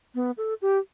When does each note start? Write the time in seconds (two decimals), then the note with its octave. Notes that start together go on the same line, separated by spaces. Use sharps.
0.15 B3
0.38 A4
0.62 G4